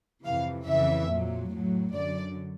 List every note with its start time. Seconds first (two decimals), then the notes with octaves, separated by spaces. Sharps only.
0.24 F2 C3 E3 F5
0.66 F2 C#3 E3 E5
1.10 A#2 F#3
1.53 A2 F#3
1.96 F#2 D3 F#3 D5